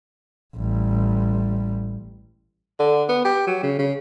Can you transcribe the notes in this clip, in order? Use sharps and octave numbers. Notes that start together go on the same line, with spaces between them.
A1 G3
D3
B3
G4
F#3
C#3
C#3